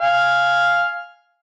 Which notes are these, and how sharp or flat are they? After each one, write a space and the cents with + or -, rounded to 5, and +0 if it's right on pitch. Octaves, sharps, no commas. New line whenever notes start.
F5 +0 G#5 +0